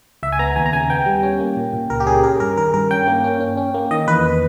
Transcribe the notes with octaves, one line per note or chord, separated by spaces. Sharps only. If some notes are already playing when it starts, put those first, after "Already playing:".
C#2 E5
G#5
B3 A#5
D#2 G#5
A#5
C#3 G#5
B3 G5
G3
C#4
A#3
A#2
A#2
C#2 A#4
G4
C#4 G#4
C#4 A#4
G2 A#4
D#3 A#4
G2 A#4
C#4 G5
A#3
C#4
C#4
C#4
A#3
D#3 D#5
E2 B4